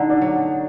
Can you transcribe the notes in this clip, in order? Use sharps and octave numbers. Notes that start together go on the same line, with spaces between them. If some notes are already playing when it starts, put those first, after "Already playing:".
Already playing: D3 D#4 E4
D4
F#3